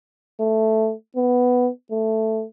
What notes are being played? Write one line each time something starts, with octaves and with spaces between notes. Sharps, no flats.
A3
B3
A3